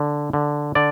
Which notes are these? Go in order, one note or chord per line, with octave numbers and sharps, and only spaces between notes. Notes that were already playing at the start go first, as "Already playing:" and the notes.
Already playing: D3
D3
D3 D5